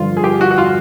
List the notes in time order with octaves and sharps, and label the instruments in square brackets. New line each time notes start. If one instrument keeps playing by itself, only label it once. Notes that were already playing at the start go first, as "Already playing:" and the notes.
Already playing: [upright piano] G2 D3 F3 [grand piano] F4
[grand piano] G#4
G4
F#4
F#4
F4